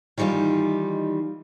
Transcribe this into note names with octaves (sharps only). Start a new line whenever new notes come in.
D#3 E3 G3 D#4 F4